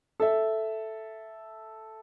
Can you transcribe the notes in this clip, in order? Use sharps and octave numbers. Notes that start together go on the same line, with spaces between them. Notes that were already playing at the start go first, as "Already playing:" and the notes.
A4 E5